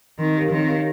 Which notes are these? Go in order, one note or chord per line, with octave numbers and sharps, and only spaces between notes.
D#3 C4
G4 A#4 C#5 F5
D#3 C4
G4 A#4 C#5 F5